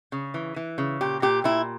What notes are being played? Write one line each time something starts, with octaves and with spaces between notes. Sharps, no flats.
C#3
E3
E3
C#3
A#2 G4
A#2 G4
A#2 E4